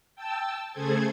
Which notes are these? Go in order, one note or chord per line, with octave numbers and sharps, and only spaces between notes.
G5 A5 E6
C#3 A3 G#4 A4 C5 G#6